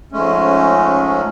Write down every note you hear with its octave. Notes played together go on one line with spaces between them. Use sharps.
F2 G#2 G#3 A3 C#4